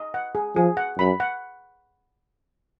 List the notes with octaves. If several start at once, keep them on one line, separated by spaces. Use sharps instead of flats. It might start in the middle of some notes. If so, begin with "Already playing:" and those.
Already playing: D#5
F#5
G#4
F3 G#4
F#5
F#2 B5
F#5